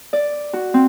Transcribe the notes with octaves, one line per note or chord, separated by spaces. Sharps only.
D5
F#4
C4